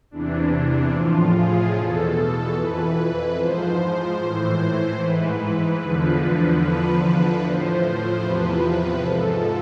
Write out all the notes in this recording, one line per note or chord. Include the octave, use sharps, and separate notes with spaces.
E2 C3 E3 D4
A2 F3 F4
G#4
E2 B2 A4
F2 E3 B4
G#2 F3 C5
A2 E3
G#2 E3 B4
E2 D3 F3
E2 D3 F3 B4
A2 F3 C5
E2 C3 F3 B4
G#2 F3 A4